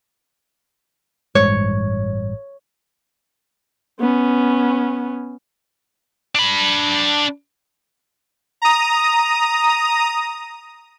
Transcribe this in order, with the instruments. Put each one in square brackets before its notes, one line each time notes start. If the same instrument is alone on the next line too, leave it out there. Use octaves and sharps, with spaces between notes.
[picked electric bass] A1 G2 G#3 [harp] C#5
[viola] B3 C#4
[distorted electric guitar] D4 B5
[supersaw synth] A#5 D#6